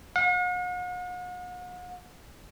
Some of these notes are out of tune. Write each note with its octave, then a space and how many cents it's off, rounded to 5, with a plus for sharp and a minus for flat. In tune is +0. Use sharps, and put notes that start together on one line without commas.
F#5 -45